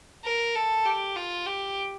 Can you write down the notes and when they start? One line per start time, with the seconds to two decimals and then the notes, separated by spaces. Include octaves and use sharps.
0.24 A#4
0.55 A4
0.85 G4
1.16 F4
1.46 G4